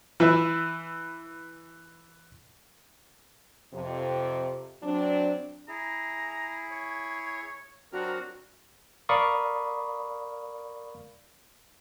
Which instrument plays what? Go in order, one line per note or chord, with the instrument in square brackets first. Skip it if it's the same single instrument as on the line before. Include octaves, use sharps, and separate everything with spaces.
[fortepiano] E3 B4 E5
[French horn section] F2 C3
F#3 C4 D4
[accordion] E4 G#4 [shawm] A#5
[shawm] C#5
[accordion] F#3 C4 D4 [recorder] F#4 [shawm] A#4
[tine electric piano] A#4 D5 F5 B5 C#6 D#6